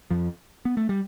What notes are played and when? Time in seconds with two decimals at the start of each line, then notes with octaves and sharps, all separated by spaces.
0.11 F2 F3
0.65 B3
0.77 A3
0.89 G3